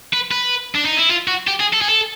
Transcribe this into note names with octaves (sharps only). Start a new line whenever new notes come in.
B4
B4
D4
D#4
E4
F4
F#4
G4
G#4
A4
G#4
A4